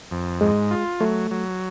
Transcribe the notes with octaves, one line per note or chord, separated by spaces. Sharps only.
F2
G#2 G#3
F4
F#3 A3
F#3